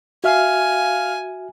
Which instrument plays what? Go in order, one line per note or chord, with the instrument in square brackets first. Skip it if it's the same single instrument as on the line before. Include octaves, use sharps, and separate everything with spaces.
[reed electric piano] F#4 E5 F6 [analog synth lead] F5 [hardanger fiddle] G#5